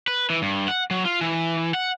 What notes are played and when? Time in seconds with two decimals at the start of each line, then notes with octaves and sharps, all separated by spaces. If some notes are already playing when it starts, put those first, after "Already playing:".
0.08 B4
0.30 E3
0.42 G2
0.68 F#5
0.91 F#3
1.05 F4
1.21 E3
1.74 F#5